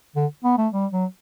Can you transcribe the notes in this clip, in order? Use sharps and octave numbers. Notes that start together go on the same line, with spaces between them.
D3
B3
A3
G3
F#3